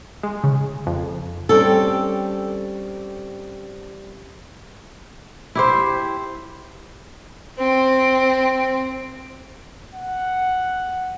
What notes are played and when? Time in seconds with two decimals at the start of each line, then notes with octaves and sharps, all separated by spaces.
0.23 G#3
0.44 C#3
0.86 F2
1.49 G3 C4 C#4 A4
5.55 E4 G4 C5
7.57 C4
9.95 F#5